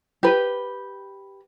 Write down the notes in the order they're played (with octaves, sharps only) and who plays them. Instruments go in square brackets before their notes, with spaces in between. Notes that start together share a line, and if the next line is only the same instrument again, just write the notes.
[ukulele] G4 B4